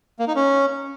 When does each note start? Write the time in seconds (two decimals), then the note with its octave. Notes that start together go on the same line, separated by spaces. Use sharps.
0.19 A#3
0.27 D#4
0.36 C#4